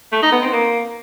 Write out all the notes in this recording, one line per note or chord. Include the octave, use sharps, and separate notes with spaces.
A3
D#4
B3
C4
A#3